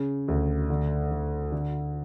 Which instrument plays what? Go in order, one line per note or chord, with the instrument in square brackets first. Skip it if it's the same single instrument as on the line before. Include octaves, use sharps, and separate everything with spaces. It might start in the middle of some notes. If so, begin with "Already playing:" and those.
Already playing: [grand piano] C#3
D2
D3
D3
D3